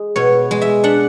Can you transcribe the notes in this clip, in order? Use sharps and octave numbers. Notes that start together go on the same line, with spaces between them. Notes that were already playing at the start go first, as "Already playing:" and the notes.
Already playing: G#3
B2 C#5
G#3
E5
D4 F#5